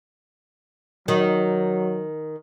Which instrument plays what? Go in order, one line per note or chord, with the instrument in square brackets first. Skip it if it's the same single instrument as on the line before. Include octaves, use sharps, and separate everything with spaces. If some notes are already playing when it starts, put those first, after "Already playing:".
[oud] D#3 [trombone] F#3